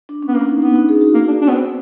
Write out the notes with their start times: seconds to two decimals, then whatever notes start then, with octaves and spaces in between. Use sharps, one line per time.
0.09 D4
0.22 C#4
0.28 B3
0.35 A#3 D4
0.49 D#4
0.62 B3 D#4
0.76 D#4
0.89 G#4
1.01 F#4
1.14 A#3
1.28 D4
1.41 D4
1.48 B3
1.55 C4